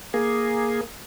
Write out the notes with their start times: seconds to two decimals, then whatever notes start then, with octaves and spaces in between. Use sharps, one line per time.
0.14 A#3 G#4